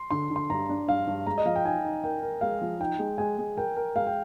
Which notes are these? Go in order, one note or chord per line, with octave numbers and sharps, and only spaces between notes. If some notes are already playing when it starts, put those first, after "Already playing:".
Already playing: C6
D3 C6
D3
C6
G2 A#5
D4
G2 F5
G2
G#3 A#5
D#5
F3 F5
G5
D#4 G#5
D#4
A#4 G5
A#4
G#3 F5
F3
D#4 G5
G#3
G#3 G#5
G#3
A#4 G5
A#4
G#3 F5
G5